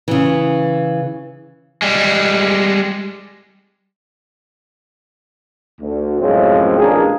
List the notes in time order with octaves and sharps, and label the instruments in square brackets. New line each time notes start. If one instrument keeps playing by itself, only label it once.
[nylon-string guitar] C#3 E3
[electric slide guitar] G3 G#3
[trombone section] D2
F#2 A2 C#3 F3 G#3 C4
A1 A#2 G#3 A#3 D4 G#4